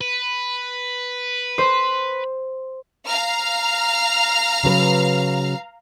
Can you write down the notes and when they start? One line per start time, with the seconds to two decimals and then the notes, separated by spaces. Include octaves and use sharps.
0.01 B4
1.58 C5
3.06 F5 A#5 F6
4.63 C#3 F#3 B4